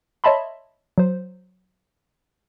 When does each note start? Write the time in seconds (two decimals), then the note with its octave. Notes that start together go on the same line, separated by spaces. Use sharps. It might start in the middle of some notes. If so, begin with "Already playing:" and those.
0.24 C#5 D#5 E5 A5 B5 C6
0.98 F#3 C5